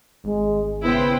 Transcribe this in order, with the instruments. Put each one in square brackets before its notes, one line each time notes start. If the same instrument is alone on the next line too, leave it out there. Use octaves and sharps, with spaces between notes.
[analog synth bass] G#1 [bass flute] G#3
[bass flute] C#3 [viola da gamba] B3 E4 [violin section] B4 C5 G5